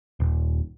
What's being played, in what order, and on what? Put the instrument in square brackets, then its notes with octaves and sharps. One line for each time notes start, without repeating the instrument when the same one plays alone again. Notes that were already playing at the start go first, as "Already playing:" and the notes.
[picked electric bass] D#1